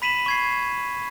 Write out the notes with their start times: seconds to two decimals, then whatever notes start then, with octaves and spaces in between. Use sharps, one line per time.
0.02 B5 B6 D#7 E7 F#7
0.26 C#6 G#6 C7